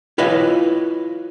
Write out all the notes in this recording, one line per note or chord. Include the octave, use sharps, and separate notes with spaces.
E4 F4 B4 C#5 D#5 F5